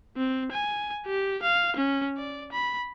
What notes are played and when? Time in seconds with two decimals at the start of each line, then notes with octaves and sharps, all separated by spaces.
0.17 C4
0.52 G#5
1.06 G4
1.43 F5
1.77 C#4
2.17 D5
2.53 B5